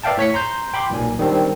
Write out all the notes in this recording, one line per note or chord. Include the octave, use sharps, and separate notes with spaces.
B4 D5 E5 F5 G5 A5
A2 C#5 B6 C#7
A#5 C6 G6
G5 B5 C6 D6
B1 A#2 G#5
D#3 G3 C4 D4